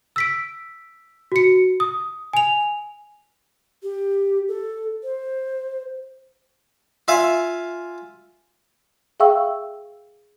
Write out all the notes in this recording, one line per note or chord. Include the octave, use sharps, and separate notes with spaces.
E6 B6 D7
F#4 C#7
D#6
G#5 F7
G4
A4
C5
F4 E5 F5 G#5
G#4 E5 F5 G5 C#6 E6